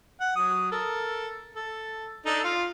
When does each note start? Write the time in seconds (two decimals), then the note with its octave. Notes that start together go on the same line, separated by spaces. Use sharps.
0.20 F#5
0.36 F#3 D#6
0.71 A4 A#4
1.56 A4
2.26 D4 D#4 A4
2.44 F4 F5